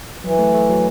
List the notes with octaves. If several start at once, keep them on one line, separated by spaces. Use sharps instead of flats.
E3 F#3
A3
A3
F#3